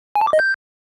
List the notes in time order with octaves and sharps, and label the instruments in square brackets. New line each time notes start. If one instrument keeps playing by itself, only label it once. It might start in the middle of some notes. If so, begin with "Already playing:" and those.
[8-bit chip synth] G#5
A5
D6
D#5
G6